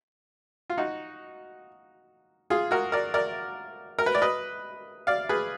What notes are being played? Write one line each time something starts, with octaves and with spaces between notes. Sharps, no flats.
F4
D#4 F#4
F4 G#4
F#4 A#4
A#4 D5
A#4 D5
A#4
B4
D5
B4 D#5
D5 F5
G#4 B4